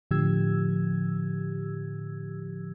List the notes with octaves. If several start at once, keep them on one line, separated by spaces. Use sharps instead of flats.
A2 D3 F3 G4 E6 G#6